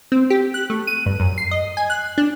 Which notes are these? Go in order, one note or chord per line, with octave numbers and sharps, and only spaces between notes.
C4
G4
F#6
A3
D#7
G2
F#2
C7
D#5
G#5
F#6
D4